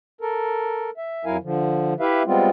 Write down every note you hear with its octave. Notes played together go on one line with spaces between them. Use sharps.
A4 A#4
E5
F2 F#3 E4 A#4 F5 G#5
D3 F3
E4 G4 B4 E5 F5
G3 G#3 B3 C4 F4